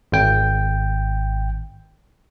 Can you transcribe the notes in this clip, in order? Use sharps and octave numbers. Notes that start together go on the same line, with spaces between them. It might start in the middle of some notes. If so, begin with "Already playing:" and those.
G#1 G5